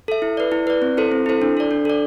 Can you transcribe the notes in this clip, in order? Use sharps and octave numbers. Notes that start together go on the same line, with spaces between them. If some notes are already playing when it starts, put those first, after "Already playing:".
A4 E5
E4
B4 D5
E4
B4 D5
C4
E4 A4 C5
C4
E4 A4 C5
D4
A4 D5
D4
A4 D5